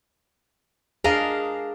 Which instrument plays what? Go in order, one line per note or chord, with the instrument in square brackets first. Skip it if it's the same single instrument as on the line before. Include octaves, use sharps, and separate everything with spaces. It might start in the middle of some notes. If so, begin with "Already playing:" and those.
[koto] D4 A#4 D#5 [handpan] G#4 F5